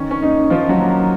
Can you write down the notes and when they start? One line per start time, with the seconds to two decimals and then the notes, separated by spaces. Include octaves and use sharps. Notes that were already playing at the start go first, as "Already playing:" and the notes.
Already playing: D#3 C#4
0.11 C#4
0.22 A#3 D#4
0.50 D#3 F3 F4
0.69 F#3 F#4
0.80 A#3